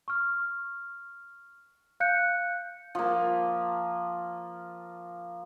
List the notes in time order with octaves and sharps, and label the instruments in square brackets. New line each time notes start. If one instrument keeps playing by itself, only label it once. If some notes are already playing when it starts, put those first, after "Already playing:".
[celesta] C#6 F6
F5 F#6 G6 C#7
[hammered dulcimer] F3 A#3